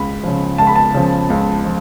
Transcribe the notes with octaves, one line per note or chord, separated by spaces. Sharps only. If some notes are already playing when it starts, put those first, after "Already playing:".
Already playing: C#2 B5
C#3 F3
C#2 A5
B5
A5
C#3 F3
C#2
F3